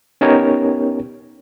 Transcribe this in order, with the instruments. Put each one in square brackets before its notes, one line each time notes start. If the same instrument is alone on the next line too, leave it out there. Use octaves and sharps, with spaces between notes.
[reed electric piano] B3 C#4 D#4 G4 A#4 C#5